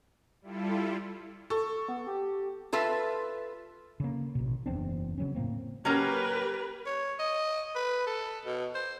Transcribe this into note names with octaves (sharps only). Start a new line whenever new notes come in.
G3 E4 F4 A4
A4 C#6
B3
G4
F4 A4 B4 E5
C#3 A#3
A1 B2
F#1 E2 C4 D4
C#3 F#3 C#4
A2 A3 A#3 C4
F#3 A#3 C#4 G4 A#4 B4
C#5
D#5
B4
A4
B2
C5